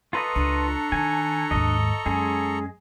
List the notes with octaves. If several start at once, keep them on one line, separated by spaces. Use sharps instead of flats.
F4 A4 B4 D#5 A#5 C#6
C#2 D4
D#3 G#5
D#2 G#2 D#5
F#2 G#3 C#4 G#4